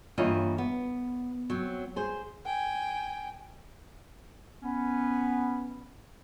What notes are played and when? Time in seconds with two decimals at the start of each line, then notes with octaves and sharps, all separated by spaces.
0.18 G2 E3 A#3 F4 C#5 D#5
0.58 B3
1.50 F#3 C4
1.96 G#4 C5
2.46 G5 G#5
4.62 B3 C#4